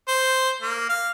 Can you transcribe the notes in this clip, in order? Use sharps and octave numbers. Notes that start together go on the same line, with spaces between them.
C5
A#3
F5